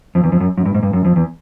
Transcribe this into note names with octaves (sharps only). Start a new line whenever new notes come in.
F2
E2
F2
F#2
F#2
G2
G#2
G2
F#2
F2
E2